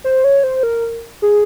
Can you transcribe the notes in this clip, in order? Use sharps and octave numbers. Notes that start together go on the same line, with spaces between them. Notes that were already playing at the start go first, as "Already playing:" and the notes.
C5
C#5
C5
A#4
G#4